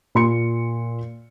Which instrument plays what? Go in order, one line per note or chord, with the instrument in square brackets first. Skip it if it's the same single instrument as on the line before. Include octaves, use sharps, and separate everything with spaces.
[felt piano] A#2 C6 C#7